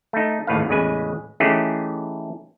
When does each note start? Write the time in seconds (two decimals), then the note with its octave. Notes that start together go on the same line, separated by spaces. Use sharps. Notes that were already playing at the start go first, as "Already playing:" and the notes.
0.13 A3 D#4
0.47 G#1 D#2 A2 B4 F5
0.69 A1 E2 C#3 G#3 B4 G#5
1.40 E3 A3 C#4 D#4 G4 G#4